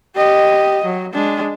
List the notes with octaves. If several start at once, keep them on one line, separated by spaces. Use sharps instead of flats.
G4 D#5
F#3
G#3 D4